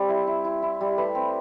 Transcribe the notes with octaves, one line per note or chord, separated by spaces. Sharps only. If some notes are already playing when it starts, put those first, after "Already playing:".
Already playing: G3 C4
E4
E4
E4
E4
G3
A3 B4
C4